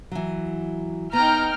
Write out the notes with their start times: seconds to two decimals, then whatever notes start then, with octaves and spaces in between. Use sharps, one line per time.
0.11 E3 F#3
1.13 B3 D#4 G5 A#5 F6